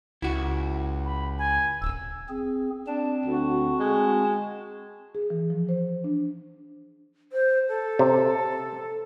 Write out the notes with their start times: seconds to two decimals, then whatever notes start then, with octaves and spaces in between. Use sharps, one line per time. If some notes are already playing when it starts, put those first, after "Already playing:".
0.22 C#2 E4 F#4
1.05 B5
1.38 G#5
1.82 D1 E6
2.29 C4 G#4
2.87 C4 D4 A5
3.26 D2 F#4
3.80 G#3
5.15 G#4
5.30 E3
5.50 F3
5.69 C5
6.04 D4
7.32 C5
7.68 A4
7.99 C3